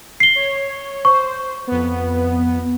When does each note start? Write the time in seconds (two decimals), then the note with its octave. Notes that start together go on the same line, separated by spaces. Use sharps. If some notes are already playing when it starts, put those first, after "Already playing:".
0.20 C7 G7
0.35 C#5
1.05 C5 C#6
1.67 F2 B3